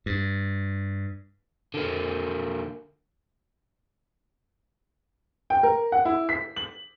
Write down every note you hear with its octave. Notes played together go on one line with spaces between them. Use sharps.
G2
D3 A#3
G5
A#4
F#5
E4
B6
F#7